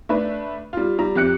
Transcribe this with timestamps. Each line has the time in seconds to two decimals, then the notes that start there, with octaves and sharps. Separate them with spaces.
0.09 A3 D4 B4
0.73 G3 F4
0.99 G3 A#5
1.15 F2 G4 F#6 C#7